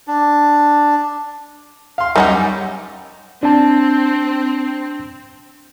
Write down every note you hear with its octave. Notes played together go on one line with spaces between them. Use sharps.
D4
F5 C6
F#2 D#3 G3 C#4 D#4 F#5
C4 D4 A5